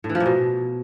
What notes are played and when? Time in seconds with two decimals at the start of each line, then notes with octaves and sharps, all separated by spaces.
0.04 A2
0.09 E3
0.15 F3
0.20 A#2
0.26 B2